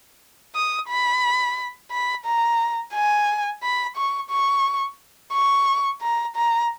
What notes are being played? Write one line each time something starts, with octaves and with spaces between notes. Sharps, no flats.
D#6
B5
B5
A#5
G#5
B5
C#6
C#6
C#6
A#5
A#5